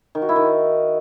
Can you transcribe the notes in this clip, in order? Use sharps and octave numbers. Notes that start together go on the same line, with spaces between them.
D#3
F#4
E4
D#3